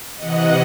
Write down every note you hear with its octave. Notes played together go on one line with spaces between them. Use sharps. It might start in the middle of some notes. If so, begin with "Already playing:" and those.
C3 E3 D#5 F#5